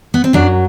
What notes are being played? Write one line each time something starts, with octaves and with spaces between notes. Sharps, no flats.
B3
C4
F#2 F#3 D4